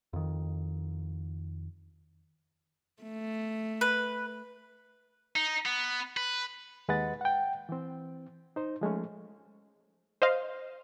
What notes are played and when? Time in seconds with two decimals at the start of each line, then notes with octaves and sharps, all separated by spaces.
0.13 F2 D#3
3.02 A3
3.81 B4
5.36 D#4
5.66 B3
6.17 B4
6.88 D#2 G#3 B4 D#5 F#5 A6
7.21 F#5 G5
7.69 E3 C4
8.56 D#4 C5
8.81 F3 G#3 A3 C#4
10.22 C5 D#5 F5